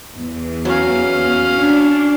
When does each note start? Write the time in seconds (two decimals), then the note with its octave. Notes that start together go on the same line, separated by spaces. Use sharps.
0.15 E2
0.65 F#3 C#4 F5
1.59 D4